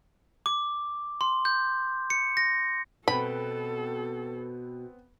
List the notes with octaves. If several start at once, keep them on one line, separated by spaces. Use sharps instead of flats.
D6
C6
G6
C#7
A#6
B2 B3 C4 A4 B5